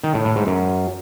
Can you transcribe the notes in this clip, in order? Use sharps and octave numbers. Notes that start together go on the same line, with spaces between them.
D#3
A2
A2
G#2
F#2